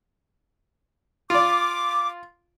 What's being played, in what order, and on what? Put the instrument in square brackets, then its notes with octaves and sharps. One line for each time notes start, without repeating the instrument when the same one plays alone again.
[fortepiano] F4 D5 [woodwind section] D6